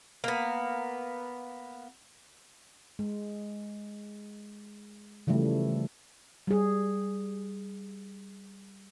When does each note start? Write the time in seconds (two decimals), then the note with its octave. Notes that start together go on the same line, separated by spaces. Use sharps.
0.24 A#3 B3
2.99 G#3
5.27 C#3 E3 F3 G3 A3
6.47 G3 G#4